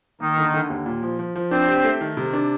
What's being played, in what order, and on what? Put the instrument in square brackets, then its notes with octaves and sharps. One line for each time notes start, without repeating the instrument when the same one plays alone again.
[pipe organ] D#3 D#4 [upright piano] A#3
[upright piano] D3
D3
D#2
A#2
F3
F3
F3
[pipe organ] C4 C5 [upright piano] D4
[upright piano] G4
A3
D#3
C3
D4